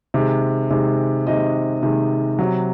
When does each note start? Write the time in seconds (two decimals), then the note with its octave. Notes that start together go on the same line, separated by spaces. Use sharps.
0.14 C3 D#3 G#3
0.70 C3 D#3 G#3
1.27 C3 D#3 G#3 D#5
1.82 C3 D#3 G#3
2.39 C3 F#3